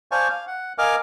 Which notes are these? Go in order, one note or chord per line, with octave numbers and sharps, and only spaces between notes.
C5 D5 F5 G#5 A5 C#6
F5
F#5
A#4 D#5 F5 G#5 D6 F6